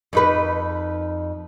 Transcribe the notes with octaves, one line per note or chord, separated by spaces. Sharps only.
F2 D#4 B4